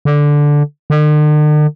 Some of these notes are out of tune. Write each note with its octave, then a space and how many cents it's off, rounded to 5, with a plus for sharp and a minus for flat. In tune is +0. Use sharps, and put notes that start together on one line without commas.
D3 -5
D3 +45